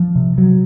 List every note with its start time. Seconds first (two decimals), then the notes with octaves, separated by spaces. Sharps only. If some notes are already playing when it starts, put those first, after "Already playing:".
Already playing: F3
0.15 C3
0.38 F#3